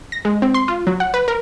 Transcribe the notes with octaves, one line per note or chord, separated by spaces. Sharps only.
A#6
G#3
C4
C6
F4
F#3
F#5
B4
A#4